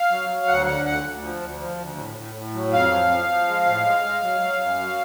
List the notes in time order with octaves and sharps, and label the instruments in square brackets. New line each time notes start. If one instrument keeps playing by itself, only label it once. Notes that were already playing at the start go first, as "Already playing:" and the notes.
Already playing: [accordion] F5
F#3
F#3
D2 F#5
D3 F#5
D2 F#5
D2
F3
D2
F3
D2
A2
A2
A2
F#3
F2 F5
F3
F3
F3
G#3
A2
G#3
G#3
F#3
F#3
F#2
F#3